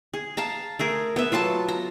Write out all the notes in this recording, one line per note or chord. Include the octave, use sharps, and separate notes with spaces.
G#4
F5 A5 A#5
A3 G#4 A#4
B3 E5
F#3 F4 A4 A5
A#5